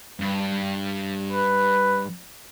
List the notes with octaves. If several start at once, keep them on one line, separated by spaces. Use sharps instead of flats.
G2
B4